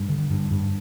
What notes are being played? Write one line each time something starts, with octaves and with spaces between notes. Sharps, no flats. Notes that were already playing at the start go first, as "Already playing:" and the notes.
Already playing: G2
D3
G2
G2